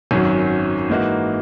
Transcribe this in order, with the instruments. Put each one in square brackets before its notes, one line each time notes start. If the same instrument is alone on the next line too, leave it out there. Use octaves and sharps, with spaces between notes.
[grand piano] G#1 F#2 D#3 F#3 C#4
G#2 E3 A#3 D#4 F#4